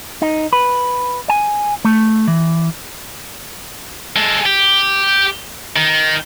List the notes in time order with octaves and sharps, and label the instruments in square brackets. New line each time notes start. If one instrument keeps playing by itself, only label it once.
[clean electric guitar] D#4
B4
G#5
A3
E3
[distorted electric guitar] G#3 A4
G4
D#3